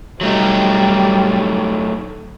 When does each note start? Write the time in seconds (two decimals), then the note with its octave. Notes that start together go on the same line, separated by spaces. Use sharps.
0.21 F#3 G3 A3 D#4